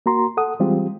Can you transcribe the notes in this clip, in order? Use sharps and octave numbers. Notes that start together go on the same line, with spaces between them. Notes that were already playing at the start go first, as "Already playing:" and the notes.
A#3 F#4 A#5 C6
A4 F#5 D#6
E3 G3 G#3 C4 F4 G4